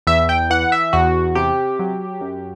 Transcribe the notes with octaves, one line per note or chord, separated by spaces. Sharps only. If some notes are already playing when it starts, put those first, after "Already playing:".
E2 E5
G5
E3 F#5
E5
E2 F#4
C3 G4
F#3
F#2